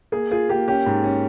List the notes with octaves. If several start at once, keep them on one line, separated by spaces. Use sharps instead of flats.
A#3 G#4
F4 G#4
A#3 G4
C#4 G4
G#2
C#4